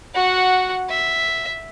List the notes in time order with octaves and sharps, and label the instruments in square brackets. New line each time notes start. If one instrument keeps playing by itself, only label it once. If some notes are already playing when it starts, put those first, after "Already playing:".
[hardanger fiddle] F#4 F#5
E5